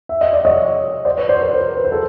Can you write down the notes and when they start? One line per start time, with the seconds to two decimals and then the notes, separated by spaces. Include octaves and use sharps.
0.09 E5
0.21 D#5
0.33 D5
0.45 C#5 D#5
1.05 C5 D5
1.17 B4 C#5
1.29 C5 D5
1.41 A#4 C5
1.53 A#4 C5
1.77 B4
1.85 C5
1.92 A4 B4